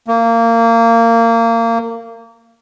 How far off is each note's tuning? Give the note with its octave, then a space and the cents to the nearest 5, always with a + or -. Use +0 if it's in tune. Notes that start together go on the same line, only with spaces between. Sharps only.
A#3 -25